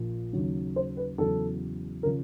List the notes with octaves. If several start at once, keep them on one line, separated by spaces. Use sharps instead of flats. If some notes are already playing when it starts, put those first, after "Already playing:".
Already playing: A#1 A#2 F3
D#2 C#3 F#3
C5
B4
E2 C#3 F#3 A4
C#3 F3 A#4